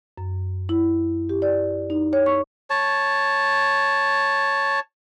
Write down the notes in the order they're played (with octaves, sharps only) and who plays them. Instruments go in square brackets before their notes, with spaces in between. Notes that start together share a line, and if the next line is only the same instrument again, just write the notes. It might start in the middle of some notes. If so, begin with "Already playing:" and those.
[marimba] F#2
E4
G4
D5
D#4
C#5
C#6
[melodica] C#5 A5